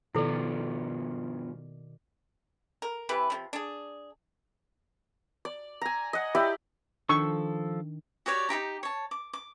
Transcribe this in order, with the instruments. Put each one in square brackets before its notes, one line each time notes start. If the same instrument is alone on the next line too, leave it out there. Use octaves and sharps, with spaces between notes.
[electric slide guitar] G2 F3 B3 [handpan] B2 D#3 D5 [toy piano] E4 A4
[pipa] A#4
C3 E3 G4 B4
C3 F3
D4 G#4
[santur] D5
G#5 A#5
D#5 F#5
E4 G4 D5 G5
[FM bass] D#3 [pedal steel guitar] F3 A4 E6 [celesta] D4 [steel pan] C#6
[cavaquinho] F#4 G4 C#5 D5
D#4 E4 G4 A#5
C#5 A5
D6
D6